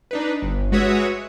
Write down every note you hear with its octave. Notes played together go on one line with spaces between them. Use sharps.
D4 D#4 B4
G1
G#3 F#4 B4 C#5 E5 D#6